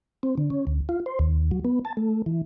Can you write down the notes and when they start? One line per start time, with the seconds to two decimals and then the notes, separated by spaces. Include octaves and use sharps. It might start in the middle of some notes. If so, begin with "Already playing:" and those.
0.23 C4
0.38 D3
0.50 C#4
0.67 D2
0.89 F4
1.06 C5
1.19 D#2
1.51 F#3
1.65 B3
1.85 A5
1.97 A3
2.26 E3